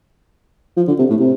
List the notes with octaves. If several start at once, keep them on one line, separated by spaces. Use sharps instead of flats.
F3
D3
C3
A2
C3